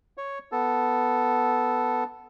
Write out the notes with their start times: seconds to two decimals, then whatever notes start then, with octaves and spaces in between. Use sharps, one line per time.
0.18 C#5
0.52 B3 A4